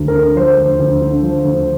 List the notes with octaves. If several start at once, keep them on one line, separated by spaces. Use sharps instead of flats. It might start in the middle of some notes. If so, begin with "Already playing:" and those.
Already playing: D2
A#4
D3
F3 C5
D2
D2
D3
F3
D2